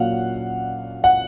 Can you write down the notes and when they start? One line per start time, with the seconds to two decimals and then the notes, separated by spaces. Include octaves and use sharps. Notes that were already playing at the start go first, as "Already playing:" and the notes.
Already playing: A#2 F#3 A#3 C#4 F5 F#5
1.04 F#5